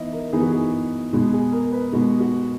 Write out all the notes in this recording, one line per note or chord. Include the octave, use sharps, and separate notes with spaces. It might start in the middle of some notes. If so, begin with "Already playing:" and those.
Already playing: E3 B3 D#4 D#5 E5
A#4
E3 B3 D#4 G#4
F#4
G#4
B2 G#3 B3
G#4
A#4
B4
B2 G#3 B3 F#4
F#4